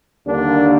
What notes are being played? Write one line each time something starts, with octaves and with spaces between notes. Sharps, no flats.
D#2 D3 G3 A#3 D4